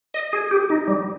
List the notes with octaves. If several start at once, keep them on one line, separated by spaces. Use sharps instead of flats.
D#5
G#4
G4
D#4
G3